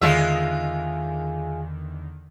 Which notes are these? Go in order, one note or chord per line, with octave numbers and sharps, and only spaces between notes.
E2 D3 D#3 G#3 F4 E5